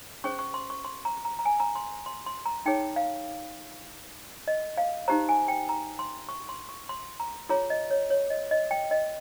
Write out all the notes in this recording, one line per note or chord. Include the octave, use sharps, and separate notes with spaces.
C#4 G#4 C5 C#6
C#6
C6
C#6
C6
A#5
A#5
A#5
G#5
A#5
C6
C6
C6
A#5
D#4 G#4 C#5 G5
F5
D#5
F5
D#4 G4 C5 A#5
G#5
G5
A#5
C6
C#6
C6
C#6
C6
A#5
F4 G#4 C#5 A#5
D#5
C#5
C#5
D#5
D#5
G5
D#5